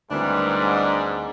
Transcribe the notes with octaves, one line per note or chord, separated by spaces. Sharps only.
D2 G#2 D#3 E3 G3 C4 D4